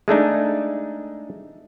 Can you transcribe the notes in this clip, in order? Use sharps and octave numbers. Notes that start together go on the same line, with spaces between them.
G#3 A3 D4 D#4